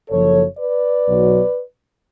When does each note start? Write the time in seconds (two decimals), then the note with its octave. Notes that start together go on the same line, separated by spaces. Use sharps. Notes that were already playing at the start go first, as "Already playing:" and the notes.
0.10 F#1 F#2 F3 A4 C#5
0.58 B4 D5
1.06 B1 B2 F#3